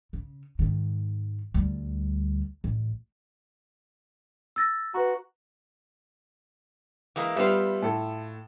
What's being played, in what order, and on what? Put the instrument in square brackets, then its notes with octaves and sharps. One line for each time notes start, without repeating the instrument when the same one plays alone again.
[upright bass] C#3
G#2 D#3
D2 G3
A1
[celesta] E6 A6 A#6
[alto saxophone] F#4 [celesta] B4 A#5
[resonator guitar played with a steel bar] E3 G#3 A#3
[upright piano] G3 B3 G4 [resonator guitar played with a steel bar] F4 E5
[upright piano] A2 A4